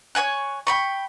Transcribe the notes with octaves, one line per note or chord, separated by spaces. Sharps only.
C#5 E5 G#5 F#6
G5 B5 C#6